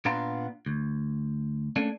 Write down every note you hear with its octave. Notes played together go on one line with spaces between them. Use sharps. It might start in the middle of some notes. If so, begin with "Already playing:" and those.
A#2 B3 D4 F5 A#5 C6
D2
A3 A#3 C#4 D4